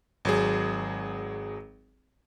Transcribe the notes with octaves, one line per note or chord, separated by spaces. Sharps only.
G#1 F#3 G#4